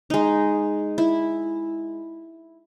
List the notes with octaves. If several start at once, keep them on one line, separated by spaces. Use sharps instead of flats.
G#3 D#4
E4